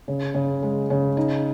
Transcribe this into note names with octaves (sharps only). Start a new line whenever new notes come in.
C#3
C#3
G#3
C#3
D#4